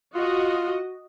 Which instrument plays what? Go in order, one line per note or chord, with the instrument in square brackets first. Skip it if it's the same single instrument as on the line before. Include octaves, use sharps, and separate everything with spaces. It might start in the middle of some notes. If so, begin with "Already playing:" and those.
[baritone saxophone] F4 [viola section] F#4 D#5